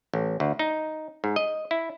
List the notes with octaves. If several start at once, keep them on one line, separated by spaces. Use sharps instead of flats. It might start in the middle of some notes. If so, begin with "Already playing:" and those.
A1
D2
D#4
G#2
D#5
E4